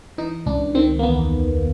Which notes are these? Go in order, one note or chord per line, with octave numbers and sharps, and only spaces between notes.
E3 D#4
C#2 D4
D#3 C4
A#3
E2 B3